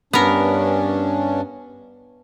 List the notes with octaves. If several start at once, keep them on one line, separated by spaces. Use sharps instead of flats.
G2 B3 C#4 D4 A#4